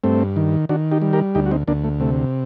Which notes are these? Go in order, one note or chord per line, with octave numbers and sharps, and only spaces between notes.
G2 A3 C4
D#3
D#3 D4 F#4
D#4 G4
G3
G4 A#4
D2 D#4 G4
F#4
C4 D#4
D2 A#3 D4
A3
C3 A3